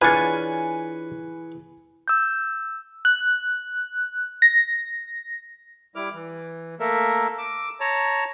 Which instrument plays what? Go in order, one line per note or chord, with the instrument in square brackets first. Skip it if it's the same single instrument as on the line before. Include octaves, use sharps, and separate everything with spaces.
[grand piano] E3 G#4 [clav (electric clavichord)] D4 F4 C#5 [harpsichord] B4 C#6 [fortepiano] G#5
[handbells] E6 G6
[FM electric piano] F#6
A#6
[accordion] G3 E4 D6 F6
E3
A3 A#3 A4 A#4 E5
D6 E6
C#5 A5 A#5